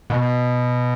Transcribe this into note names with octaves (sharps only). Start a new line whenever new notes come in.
B2